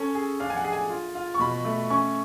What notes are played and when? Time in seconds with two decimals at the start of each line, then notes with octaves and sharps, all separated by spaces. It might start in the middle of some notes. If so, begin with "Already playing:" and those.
Already playing: C#4 A4
0.15 G#4
0.40 D4 F5
0.50 G#5
0.56 F#5
0.64 G#4
0.73 G#5
0.90 F4
1.15 F4
1.34 C#6
1.39 B2 B5
1.65 A3
1.90 C#4 C#6